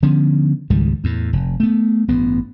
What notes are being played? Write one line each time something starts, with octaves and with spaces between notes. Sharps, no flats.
D3 F3 B3 C#4
C#2 G#2 D#3 G3
E2 A2
F1
A3 B3
A1 G2 B3